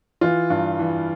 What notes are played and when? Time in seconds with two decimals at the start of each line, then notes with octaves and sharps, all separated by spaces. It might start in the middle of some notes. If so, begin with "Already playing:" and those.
0.21 E3 F4
0.50 G2
0.79 E3